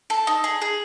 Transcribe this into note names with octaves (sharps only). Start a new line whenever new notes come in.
A4
D#4
G#4
G#4